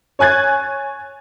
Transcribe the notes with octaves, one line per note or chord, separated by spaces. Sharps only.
C#5 G#5 F#6 G#6 A6